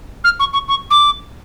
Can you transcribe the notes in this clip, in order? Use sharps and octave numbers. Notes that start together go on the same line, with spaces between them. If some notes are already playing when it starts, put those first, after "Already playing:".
F6
C#6
C#6
C#6
D6